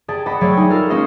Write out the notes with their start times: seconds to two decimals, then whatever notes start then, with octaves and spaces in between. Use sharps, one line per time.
0.08 G4 G#4 D5 A5
0.26 D#5 F#5 A5 B5 D6
0.41 F#3 G3 A3 G#4 C#5 D5
0.57 D#4 G#4 G#5
0.70 F4 A4 A#4
0.90 G#3 A#3 C#4 C5 D#5